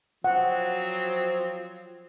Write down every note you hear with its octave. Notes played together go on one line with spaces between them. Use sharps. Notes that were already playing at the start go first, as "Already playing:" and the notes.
F3 F#3 C4 F#5